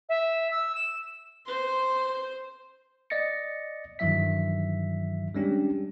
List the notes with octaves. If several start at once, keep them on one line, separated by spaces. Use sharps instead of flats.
E5
E6
E7
C5 C6
D5 D#5 A6 A#6 C#7
G2 D#3 E3 F#3 E5 B6
G3 G#3 C#4 D4 G4